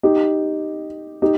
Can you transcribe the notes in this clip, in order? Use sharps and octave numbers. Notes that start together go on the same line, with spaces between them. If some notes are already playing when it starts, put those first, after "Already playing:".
D#4 G4
D#4 G4